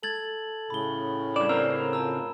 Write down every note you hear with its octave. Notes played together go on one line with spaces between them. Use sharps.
A4 G#6 A6 F#7
A2 C#3 B5 G7
G2 D4 D5 E7
C4 A#4 A#5 E6
F2 A5 A#5 E6